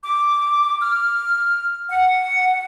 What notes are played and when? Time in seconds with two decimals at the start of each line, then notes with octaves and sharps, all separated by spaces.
0.03 D6
0.81 F6
1.90 F#5